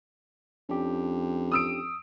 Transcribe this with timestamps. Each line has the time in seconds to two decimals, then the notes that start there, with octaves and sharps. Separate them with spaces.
0.69 F2 C#4 D4 G4
1.52 D#6 E6 D7